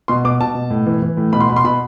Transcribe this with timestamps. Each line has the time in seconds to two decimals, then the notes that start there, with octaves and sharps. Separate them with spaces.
0.08 B2 C6
0.25 B2 D6
0.40 B2 A5
0.55 B2
0.70 A2
0.86 E3
1.02 E3
1.17 A2
1.33 B2 B5
1.41 C6
1.49 B2 B5
1.56 C6
1.64 B2 B5